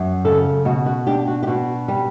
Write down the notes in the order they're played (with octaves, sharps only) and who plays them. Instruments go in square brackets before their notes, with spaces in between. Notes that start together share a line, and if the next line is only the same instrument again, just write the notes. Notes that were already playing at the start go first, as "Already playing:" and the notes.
Already playing: [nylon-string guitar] F#2
C#3 A4
B2 F#4
F#4
D4 G4
F#4
G4
B2 F#4
G3